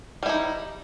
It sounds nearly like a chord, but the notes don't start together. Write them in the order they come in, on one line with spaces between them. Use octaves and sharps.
G3 E4 D#4